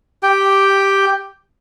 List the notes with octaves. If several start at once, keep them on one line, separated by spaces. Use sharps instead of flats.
G4 G5